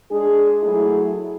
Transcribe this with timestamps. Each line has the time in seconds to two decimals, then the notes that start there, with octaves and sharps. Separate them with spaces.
0.10 G#3 D4 G#4
0.61 F#3 A3 E4 G#4